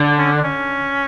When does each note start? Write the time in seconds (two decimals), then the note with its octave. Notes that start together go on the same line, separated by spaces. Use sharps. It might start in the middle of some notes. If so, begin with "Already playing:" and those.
Already playing: D3
0.18 C#4
0.32 D4
0.43 C#4